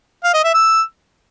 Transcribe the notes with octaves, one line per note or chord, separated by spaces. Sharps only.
F5
D#5
E5
E6